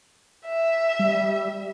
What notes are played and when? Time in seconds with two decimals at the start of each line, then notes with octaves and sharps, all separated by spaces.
0.46 E5
0.99 G3